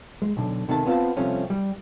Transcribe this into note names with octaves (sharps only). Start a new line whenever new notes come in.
G#3
B1 D3
C#2 C3 D#3 A3 A#4 A5
B3 C4 F4 B4 C5 A5
C3 F3 G3 A3 C4 C#4
G3